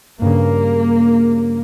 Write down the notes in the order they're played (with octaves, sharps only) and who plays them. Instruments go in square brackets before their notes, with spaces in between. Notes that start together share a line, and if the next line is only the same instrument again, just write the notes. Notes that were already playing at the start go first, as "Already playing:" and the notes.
[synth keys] G2 C#3 [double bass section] A#3